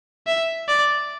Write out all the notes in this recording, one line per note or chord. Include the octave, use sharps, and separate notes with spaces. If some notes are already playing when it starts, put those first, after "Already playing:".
E5
D5